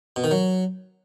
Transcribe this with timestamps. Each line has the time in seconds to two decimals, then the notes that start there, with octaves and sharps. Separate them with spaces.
0.16 B2
0.24 D#3
0.31 F#3